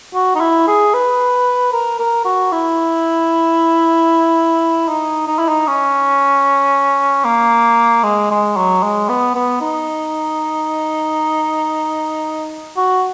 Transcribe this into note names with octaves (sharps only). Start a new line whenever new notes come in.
F#4
D#4
E4
G#4
B4
A#4
A#4
F#4
E4
D#4
D#4
E4
D#4
C#4
A#3
G#3
G#3
F#3
G#3
B3
B3
D#4
F#4